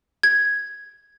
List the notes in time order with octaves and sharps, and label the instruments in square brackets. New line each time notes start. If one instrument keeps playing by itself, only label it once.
[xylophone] G#6